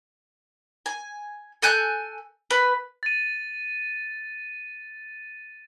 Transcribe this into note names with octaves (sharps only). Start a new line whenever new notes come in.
G#5
A4 G#5 F#6 G6
B4
A6 D#7